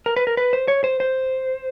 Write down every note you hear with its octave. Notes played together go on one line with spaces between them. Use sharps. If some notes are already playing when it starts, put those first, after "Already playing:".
A#4
B4
A#4
B4
C5
C#5
C5
C5